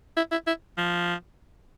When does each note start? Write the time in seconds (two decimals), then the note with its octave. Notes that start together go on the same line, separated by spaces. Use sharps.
0.17 E4
0.32 E4
0.47 E4
0.78 F3